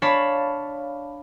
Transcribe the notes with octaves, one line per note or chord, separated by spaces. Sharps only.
D4 C#5 F5 A5 B5